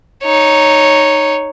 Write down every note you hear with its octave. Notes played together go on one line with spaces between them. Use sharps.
D#4 C#5